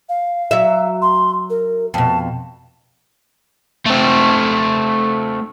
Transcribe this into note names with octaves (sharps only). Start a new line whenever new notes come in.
F5
F#3 E5
C6
A#4
F2 B2 A5
A3 C4